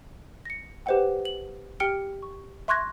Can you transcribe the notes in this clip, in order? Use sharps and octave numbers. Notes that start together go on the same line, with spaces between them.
A#6 C#7
G4 B4 C5 D#5 F#5 G5
F#7
G4 G5 F6 C#7 D7 G7
C#6
E5 C6 C#6 F#6 G#6 A#6